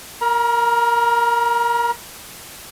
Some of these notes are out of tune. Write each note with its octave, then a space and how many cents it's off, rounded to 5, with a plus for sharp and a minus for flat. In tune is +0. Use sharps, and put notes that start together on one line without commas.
A#4 +0 A#5 +40